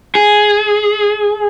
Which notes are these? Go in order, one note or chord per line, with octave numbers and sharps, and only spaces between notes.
G#4